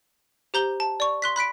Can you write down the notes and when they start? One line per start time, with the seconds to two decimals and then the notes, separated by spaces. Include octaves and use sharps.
0.54 G4 C5 A#5 G6 G7
0.80 A5
1.00 D5 C#6
1.22 C6 F#6 B6
1.36 B5 F#6 B6 D7